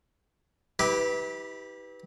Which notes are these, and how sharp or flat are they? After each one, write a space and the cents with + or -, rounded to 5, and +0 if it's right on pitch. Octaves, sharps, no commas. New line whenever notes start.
E4 -40 G4 +0 B4 +0